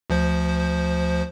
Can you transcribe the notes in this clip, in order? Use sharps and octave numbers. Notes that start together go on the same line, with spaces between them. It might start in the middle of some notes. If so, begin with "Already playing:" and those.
D2 F3 C5